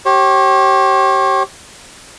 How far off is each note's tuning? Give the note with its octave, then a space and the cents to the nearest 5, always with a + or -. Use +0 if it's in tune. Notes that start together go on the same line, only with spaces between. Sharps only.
G4 -25 C#5 -45